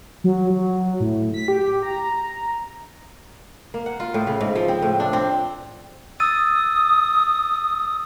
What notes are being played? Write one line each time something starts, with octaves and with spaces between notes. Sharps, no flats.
F#3
F#3
A2
B6
G4
A#5
A#3
F#5
F4
A2
C#3
G#2
F3
C4
A2
D4
C4
D#6 E6 A6 D#7